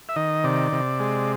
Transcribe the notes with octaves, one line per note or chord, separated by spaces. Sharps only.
E5
D#3 D#5
C3 D5
C3
G#3